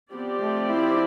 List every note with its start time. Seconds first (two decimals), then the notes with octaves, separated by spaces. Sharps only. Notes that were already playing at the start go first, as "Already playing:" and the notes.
0.12 F3 B3 C4 G4 D5
0.41 A3
0.69 E4